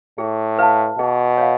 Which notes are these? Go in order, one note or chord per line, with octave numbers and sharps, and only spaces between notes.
A2 G#4
B4 F5 A5
B2 G#4
C#5 F5